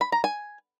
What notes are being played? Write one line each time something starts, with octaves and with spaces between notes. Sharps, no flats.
B5
A#5
G#5